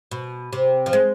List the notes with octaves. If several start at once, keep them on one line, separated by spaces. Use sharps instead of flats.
B2
C3
F3
G#3